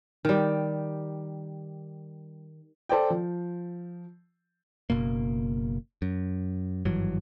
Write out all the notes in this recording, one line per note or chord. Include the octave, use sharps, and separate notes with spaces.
D#3 G3
A4 C5 D5 G5
F3
F#1 B2 A#3
F#2
G#1 G2 E3 F#3